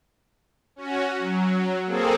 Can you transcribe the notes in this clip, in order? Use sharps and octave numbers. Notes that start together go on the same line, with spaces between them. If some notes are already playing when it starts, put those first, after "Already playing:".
C#4 F#4
F#3
A#3 C4 G#4 A4